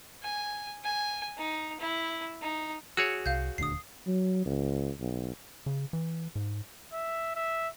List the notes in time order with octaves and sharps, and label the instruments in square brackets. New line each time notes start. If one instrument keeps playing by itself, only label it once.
[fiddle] G#5
G#5
D#4
E4
D#4
[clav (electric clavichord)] F#4 G#4 C#5 [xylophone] E6 C#7
[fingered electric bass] C2 [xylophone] F5 G6
[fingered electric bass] D#1 D2 D4 [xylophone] D#6 C7
[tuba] F#3
C#2
B1
[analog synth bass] C#3
E3
G#2
[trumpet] E5
E5